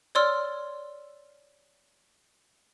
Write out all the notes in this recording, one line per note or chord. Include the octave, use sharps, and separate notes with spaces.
C#5 D5 C6 E6 F6